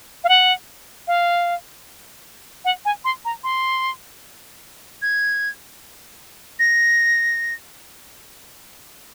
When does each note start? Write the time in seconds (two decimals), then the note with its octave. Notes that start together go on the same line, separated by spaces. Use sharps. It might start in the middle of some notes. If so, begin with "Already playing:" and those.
0.24 F5
0.29 F#5
1.07 F5
2.65 F#5
2.85 G#5
3.05 C6
3.25 A#5
3.44 C6
5.02 G#6
6.59 A#6